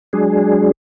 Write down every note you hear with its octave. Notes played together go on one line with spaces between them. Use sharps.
F#3 G#3 D4 G#4